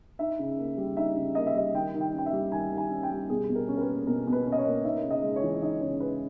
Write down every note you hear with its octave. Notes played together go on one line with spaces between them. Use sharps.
D#4 E5
C#3
A#3
G3
D#4 E5
C#3
A#3 D#5
E5
G3 D#5
D#3 G5
D#3
G5
C#4
G5
E5
G3
D#3 G#5
D#3
G#5
C#4
G5
G3
B2 G#4
B2
A#4
C#4
A#4
B4
A#3
B2 A#4
B2
B4
C#4
D#5
C#5
A#3
D#4 E5
C#3
D#5
G#3
C#5
E3
D#4 D#5
C#3 C#5
G#3 B4